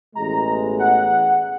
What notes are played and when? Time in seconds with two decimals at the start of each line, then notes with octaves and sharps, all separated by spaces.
0.15 A1 B2 G#3 A#5
0.79 F#5